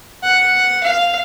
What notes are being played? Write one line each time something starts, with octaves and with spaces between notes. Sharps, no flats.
F#5
F5